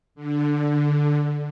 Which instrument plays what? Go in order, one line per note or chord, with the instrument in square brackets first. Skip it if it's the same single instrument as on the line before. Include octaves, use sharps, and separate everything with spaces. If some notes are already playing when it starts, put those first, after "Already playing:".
[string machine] D3